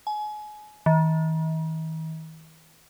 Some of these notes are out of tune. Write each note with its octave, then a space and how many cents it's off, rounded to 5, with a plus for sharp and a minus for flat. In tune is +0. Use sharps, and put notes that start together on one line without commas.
G#5 +30
D#3 +45